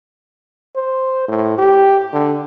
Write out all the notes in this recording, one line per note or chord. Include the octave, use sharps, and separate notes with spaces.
C5
A2
G4
D3